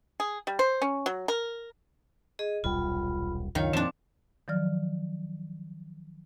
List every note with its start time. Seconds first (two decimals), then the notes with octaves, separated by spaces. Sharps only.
0.20 G#4
0.47 G3
0.59 C5
0.82 C#4
1.06 F#3
1.28 A#4
2.39 G#4 D#5
2.64 D#1 B1 G3 F4 B5
3.55 C#2 F#2 D#3 F4 C#5 F5
3.73 F2 A#2 F3 C4 D4
4.48 D#3 F3 F#3 D5 F6